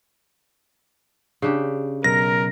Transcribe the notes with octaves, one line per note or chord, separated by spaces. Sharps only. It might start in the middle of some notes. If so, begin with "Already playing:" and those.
C#3 D4 G4
B1 A#4 A#6